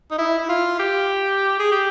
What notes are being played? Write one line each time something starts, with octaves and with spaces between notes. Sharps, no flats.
D#4
E4
E4
F4
G4
G#4
G4